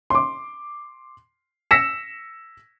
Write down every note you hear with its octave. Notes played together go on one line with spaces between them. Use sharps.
C6 D6
E6 A#6 B6 C#7 E7